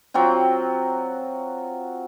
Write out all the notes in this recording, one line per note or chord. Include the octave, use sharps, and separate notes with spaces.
F#3 C4 F4 G5